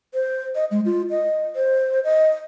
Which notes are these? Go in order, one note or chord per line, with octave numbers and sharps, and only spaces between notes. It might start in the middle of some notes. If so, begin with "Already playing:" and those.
C5
D#5
G#3
F4
D#5
C5
D#5